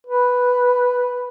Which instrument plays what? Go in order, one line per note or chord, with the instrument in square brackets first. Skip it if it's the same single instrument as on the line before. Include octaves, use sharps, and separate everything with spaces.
[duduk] B4